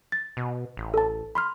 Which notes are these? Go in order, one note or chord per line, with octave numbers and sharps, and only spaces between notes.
A6
B2
A1
A4 A5
B5 C6 F6